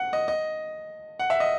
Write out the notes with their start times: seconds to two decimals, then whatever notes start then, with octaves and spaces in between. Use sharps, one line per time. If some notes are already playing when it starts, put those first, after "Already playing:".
Already playing: F#5
0.13 D#5
0.28 D#5
1.19 F#5
1.30 E5
1.40 D#5